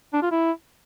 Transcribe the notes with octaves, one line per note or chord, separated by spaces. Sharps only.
D4
F4
E4